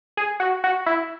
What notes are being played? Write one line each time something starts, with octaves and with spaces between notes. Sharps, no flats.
G#4
F#4
F#4
E4